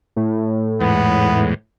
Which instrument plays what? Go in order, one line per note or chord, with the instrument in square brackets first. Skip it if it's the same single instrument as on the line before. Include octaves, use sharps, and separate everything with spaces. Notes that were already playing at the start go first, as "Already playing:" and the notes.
[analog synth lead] A2
[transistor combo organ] E2 G#2 [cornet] B3